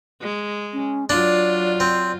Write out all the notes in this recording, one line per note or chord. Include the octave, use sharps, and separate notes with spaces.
G#3
C#4
F#3 D4 F4 D5
C4